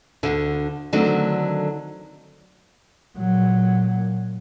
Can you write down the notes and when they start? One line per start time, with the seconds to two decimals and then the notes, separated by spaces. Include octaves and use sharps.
0.23 D2 D3
0.93 D3 D#3 F#3 A3 C4 D4
3.18 A#2 F#3